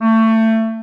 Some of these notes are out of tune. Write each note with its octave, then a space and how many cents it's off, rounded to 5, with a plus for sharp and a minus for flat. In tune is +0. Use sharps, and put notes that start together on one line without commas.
A3 +25